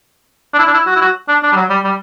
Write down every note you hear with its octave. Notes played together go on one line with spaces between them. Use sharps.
D4
E4
D4
E4
F#4
E4
F#4
D4
D4
G3
F#3
G3
G3